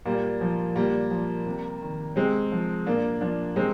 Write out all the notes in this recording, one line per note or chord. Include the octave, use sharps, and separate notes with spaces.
A#2 G3 A#3
F3
A#2 G3 A#3
F3
C3
D#3
C3 G#3 C4
F3
A#2 A#3 D4
F3 A#3 D4
C3 G#3 C4